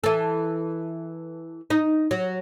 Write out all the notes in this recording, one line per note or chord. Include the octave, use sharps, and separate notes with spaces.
E3 A4
D#4
F#3